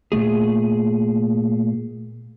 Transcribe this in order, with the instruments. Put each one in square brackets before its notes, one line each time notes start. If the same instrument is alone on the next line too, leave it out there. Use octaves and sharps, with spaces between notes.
[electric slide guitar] A#2 C#3 A3 G#4